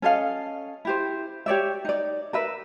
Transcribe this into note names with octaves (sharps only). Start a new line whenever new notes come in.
C#4 A4 D#5 F5
E4 G4 C5
G4 C#5 D5 E5
D#4 D5
A#4 B4 E5